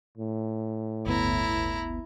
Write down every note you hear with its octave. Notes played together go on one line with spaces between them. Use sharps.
A2
G1 D2 B3 E4 A#5